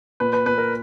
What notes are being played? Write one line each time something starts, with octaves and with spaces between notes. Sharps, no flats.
A#2 B4
B4
A#2 B4
A#4